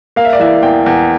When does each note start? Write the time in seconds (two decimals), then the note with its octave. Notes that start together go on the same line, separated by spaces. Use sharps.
0.16 A#3 F5
0.25 E5
0.33 D5
0.40 E3 E5
0.63 E2 G5
0.86 E2